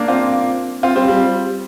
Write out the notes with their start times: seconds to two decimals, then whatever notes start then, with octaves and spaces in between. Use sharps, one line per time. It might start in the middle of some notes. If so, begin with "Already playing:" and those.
Already playing: A#3 D4
0.08 C4 F4
0.83 C4 F4
0.95 G3 C4
1.08 G3